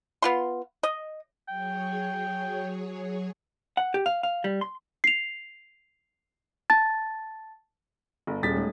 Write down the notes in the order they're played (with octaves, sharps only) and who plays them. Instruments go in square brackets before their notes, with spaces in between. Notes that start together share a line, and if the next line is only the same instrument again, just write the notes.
[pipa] B3 F4 C6
D#5
[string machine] F#3 G#4 C#5 [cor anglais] G5
[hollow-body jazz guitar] F#5
G4
F5
F5
G3
C6
[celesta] C7 F7
A5 A6
[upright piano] G1
[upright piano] D#1 A6 B6 [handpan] G3 C#4 G#4
[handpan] G#3 A3 D#4